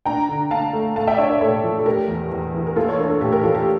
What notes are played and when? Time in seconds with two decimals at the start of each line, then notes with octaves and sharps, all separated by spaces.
0.05 D4 G5 A#5
0.29 D3
0.51 D3 F5 A5
0.73 A3
0.96 A3 F5 A5
1.07 E5 G5
1.14 D5
1.18 D4 C#5 E5
1.30 A#4 D5
1.41 A2 A4 C#5
1.64 F3
1.79 A4
1.86 A3 G4 A#4
2.08 E2
2.32 E2
2.54 E3
2.67 A#4
2.76 A#3 F4 A4
2.89 C#5
2.99 D4 A#4
3.10 A4
3.21 A2 G4
3.32 G4 A#4
3.43 F3 F4 A4
3.55 G4